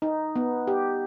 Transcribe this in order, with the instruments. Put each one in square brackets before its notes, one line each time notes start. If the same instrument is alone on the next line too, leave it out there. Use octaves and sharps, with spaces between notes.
[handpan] D#4
B3
G4